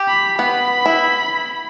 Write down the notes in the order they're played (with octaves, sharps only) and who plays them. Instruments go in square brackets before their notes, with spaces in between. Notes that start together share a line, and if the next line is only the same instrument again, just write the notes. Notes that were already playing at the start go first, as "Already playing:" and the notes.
Already playing: [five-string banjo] G4
[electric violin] B5
[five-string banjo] B3 [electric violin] B5
[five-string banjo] E4